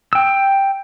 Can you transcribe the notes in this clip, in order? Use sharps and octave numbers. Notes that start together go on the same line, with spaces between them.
G5 E6